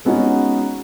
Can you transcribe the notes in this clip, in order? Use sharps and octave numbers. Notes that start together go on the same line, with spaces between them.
G#3 B3 C#4 D#4 F#4